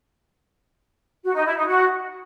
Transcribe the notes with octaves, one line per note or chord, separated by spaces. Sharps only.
F#4
D#4
E4
D#4
F#4